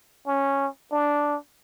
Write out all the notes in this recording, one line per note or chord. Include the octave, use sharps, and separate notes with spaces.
C#4
D4